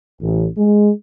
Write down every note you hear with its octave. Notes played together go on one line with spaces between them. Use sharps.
A1
G#3